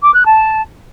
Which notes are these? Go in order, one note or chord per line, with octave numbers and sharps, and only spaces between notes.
D6
F#6
A5